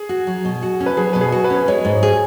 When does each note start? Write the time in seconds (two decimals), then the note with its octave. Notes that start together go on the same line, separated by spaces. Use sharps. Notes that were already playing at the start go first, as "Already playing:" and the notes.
Already playing: G#4
0.09 F#4
0.27 F#3
0.45 B2
0.63 F#4
0.80 C#4
0.86 B4
0.97 F#3 G#4
1.13 B2 B4
1.21 G#4
1.32 F#4
1.44 B4
1.50 C#4
1.68 G#3 C#5
1.85 G#2
2.03 G#4